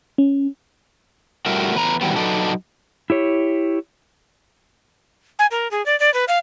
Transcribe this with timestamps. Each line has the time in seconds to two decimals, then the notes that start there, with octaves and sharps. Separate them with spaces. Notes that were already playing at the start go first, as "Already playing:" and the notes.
0.18 C#4
1.46 A2 G3 F#4 A#4 E5
1.74 E2 B4 A#5
2.01 D#3 E3 F#3 G3 B3
2.16 F#3 D4 D#4 A4 B4
3.10 E4 G4 C#5
5.39 G#5
5.51 A#4
5.71 G#4
5.86 D5
6.00 D5
6.14 B4
6.28 F5